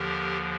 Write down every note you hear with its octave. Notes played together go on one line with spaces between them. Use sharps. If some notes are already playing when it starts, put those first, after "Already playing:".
Already playing: D#2 D3 F3 G4 A#4